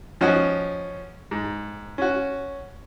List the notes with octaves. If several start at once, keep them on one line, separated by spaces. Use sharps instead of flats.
F3 C#4 D#4 F#4
G#2
C#4 F#4